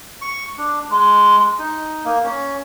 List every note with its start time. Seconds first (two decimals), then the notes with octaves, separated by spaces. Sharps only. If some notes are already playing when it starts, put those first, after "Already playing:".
0.22 C#6
0.58 D4
0.90 G#3
1.59 D#4
2.05 A#3
2.24 C#4